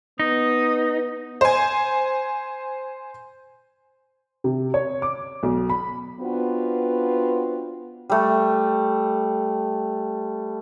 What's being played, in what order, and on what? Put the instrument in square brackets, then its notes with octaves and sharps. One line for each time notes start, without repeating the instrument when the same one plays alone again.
[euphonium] B3 [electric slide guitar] D#4 [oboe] D#6
[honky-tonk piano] C5 G#5
[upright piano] C3
C#5
D6
B1
B5
[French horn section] B3 C4 D4 F4 F#4 B4
[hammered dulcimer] G3 A3